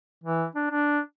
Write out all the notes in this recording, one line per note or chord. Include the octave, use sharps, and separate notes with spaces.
E3
D4
D4